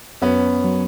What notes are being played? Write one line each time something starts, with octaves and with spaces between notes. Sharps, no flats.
F#2 B3 C#4
F#3